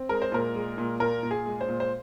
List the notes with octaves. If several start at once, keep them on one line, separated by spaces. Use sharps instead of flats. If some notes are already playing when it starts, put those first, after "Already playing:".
Already playing: C4
G#3 A#4
C5
A#2 A#4
G#3
A#2
A#2 A#4
A#2
G#4
G#3
C5
A#2
C5